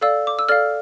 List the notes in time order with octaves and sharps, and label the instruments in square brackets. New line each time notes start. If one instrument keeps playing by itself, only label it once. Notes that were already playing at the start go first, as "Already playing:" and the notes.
[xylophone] A4 D5 F5 E6
D6
E6
A4 D5 F5 F6